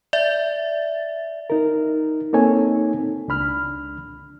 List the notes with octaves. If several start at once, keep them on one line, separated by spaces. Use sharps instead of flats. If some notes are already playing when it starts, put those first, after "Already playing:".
D5 E5 A6
D#4 A#4
A#3 C4 D#4 A4 C#5 G#5
C#2 D4 B5 F6